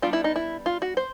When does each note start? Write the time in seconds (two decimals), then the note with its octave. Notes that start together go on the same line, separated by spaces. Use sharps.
0.02 G3 B3 D4 F4
0.13 E4
0.24 D#4
0.36 E4
0.66 F4
0.82 F#4
0.97 C5